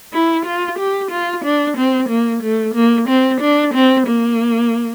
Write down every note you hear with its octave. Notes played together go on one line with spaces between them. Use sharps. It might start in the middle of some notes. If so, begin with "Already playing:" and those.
E4
F4
G4
F4
D4
C4
A#3
A3
A#3
C4
D4
C4
A#3